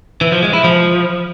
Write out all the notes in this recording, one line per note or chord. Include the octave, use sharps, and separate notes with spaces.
E3
F3
G#3
E4
F3